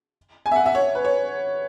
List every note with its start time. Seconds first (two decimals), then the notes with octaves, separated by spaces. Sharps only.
0.46 G#5
0.52 E5
0.56 F#5
0.66 E5
0.75 C#5
0.95 B4
1.05 C#5